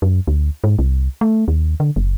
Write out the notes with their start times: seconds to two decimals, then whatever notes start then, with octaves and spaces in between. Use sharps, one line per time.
0.02 F#2
0.27 D2
0.64 G#2
0.79 C2
1.21 A3
1.48 D#2
1.80 D3
1.96 F#1